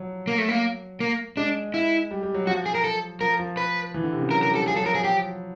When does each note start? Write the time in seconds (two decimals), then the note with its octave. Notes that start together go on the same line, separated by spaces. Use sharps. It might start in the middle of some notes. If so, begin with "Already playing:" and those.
Already playing: F3 F#3
0.27 A#3
0.38 A3
0.49 A#3
1.00 A#3
1.37 G#3 D4
1.74 E4
2.11 G3
2.23 G3
2.34 F#3
2.47 F3 F#4
2.66 G#4
2.75 A#4
2.84 A4
3.21 F3 A#4
3.39 F3
3.57 B4
3.94 E3
4.03 D3
4.12 C3
4.22 C#3
4.31 F#3 A#4
4.43 A#4
4.48 G3
4.55 A4
4.68 F3 G#4
4.76 F#3 A4
4.84 F3 A#4
4.95 G#4
5.04 G4